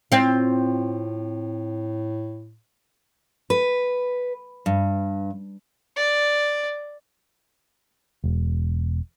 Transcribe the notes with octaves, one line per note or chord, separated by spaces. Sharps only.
A2 C4 F4
B4
G2
D5
E1